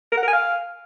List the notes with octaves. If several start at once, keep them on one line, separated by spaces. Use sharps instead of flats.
A#4
F#5
A#4
G#5
F5